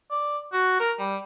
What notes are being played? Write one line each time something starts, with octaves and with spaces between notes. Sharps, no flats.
D5
F#4
A#4
G3